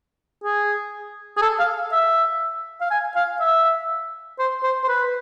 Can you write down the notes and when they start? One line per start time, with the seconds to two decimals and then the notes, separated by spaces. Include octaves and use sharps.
0.44 G#4
1.37 G#4
1.42 A4
1.59 F5
1.92 E5
2.81 F5
2.91 G#5
3.16 F5
3.40 E5
4.39 C5
4.63 C5
4.84 C5
4.88 B4